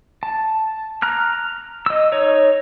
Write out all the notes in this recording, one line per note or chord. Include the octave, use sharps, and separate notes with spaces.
A5
A#5 F6 F#6
D#5 E6
D#4 C#5